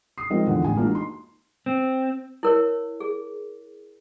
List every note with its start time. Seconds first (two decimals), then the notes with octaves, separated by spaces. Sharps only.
0.18 D#6 C7
0.30 F3 G#3 C4 D#4 A#4 D#5
0.46 E2 D3 E3 F3
0.63 A1 G#5
0.75 E3 G#3 A#3 D4 F4 F#4
0.91 D#4 C6
1.66 C4
2.43 E4 A#4 C#5
3.00 G#4